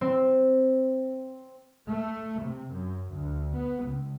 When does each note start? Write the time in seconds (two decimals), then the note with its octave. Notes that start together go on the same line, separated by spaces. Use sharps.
0.01 C4
1.88 A3
2.42 C3
2.72 F#2
3.12 D2
3.55 B3
3.85 C#2